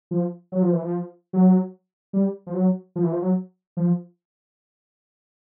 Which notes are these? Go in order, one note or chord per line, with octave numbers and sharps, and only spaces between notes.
F3
F#3
F3
E3
F3
F#3
G3
F3
F#3
F3
E3
F3
F#3
F3